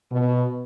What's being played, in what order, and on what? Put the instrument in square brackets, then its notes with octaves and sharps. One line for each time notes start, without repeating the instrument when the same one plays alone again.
[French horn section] B2